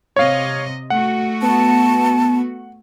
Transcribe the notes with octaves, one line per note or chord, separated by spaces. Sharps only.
C3 C#5 D#5 F5
A3 F#4 F#5
B3 A5